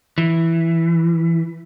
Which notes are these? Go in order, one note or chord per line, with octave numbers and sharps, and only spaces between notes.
E3